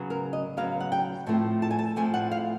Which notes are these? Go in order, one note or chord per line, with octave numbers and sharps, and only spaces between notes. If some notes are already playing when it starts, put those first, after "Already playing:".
Already playing: C#3 F#3 B3
A#4
D#5
C#3 F#3 B3 F5
F#5
G5
A2 F3 A3 C4
A5
G#5
A5
A2 F3 A3 C4 G#5
F#5
F5